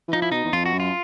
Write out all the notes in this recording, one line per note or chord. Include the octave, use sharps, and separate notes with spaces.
E3
F3 D#4
E4
B2 D#4
E2
F2 F4
F#4
F#2
F4